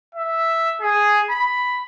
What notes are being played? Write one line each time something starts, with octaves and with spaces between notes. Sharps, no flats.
E5
G#4
B5